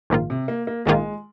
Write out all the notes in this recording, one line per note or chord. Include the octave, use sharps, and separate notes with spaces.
A#1 G#2 D#3 A#3 F4
C3
A#3
A#3
A#1 G#2 D#3 G#3 A#3 F4